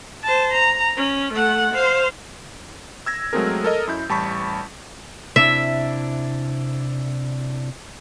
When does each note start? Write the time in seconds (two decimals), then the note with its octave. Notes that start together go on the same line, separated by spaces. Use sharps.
0.24 C5 A5
0.54 A#5
0.97 C#4
1.33 A3 F#5
1.74 C5 F5
3.06 E6 G#6 A#6
3.33 F#3 G#3 A3 C4 G#4 A#4
3.64 A4 A#4 D#5
3.87 F#2 E4 G6
4.09 A1 G3 A5 B5 C#6 B6
5.36 C3 D4 E4 E5